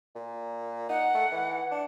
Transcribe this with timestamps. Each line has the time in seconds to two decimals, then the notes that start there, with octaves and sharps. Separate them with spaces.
0.16 A#2
0.89 D#4 F#5
1.15 A3
1.32 E3
1.71 D4